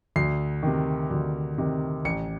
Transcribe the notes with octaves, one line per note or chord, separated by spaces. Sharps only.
D2 C7
C3 D#3
D2
C3 D#3
A1 C#7